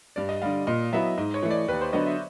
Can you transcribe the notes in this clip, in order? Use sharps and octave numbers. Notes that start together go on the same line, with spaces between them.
G2 D5
D#5
D3 G3 F5
A#2 D#5
F#3 B3 E4 E5
G#2 D#5
C#5
E3 A3
D5
D#2 B4
C5
D3 F#3 B3 D#5
E5